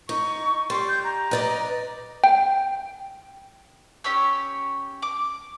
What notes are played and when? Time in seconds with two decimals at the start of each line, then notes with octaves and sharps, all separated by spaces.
0.09 D#4 C#6
0.70 G3 C6
0.89 G6
1.04 A#5
1.31 B4 D5 D#5
2.24 G5
4.04 C#4 G4 C#5 E6
5.02 D6